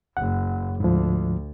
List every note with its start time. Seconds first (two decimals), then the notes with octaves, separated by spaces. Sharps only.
0.17 F#1 F#5
0.80 D2 G#2 F3